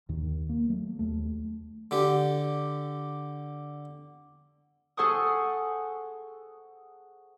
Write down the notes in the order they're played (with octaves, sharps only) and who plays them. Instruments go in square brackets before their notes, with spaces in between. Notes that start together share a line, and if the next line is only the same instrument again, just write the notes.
[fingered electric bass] D#2 D#3
A#3
F#3 A3
D#2 A3
[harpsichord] D3 G4
[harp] G#4 A4 C5 F#5 C#6 D#6